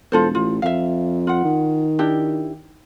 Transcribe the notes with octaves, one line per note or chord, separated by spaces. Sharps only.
E1 F4 A4 C5
A1 F4
F2 E5 F5
F4 F#5
D#3
D4 E4 G4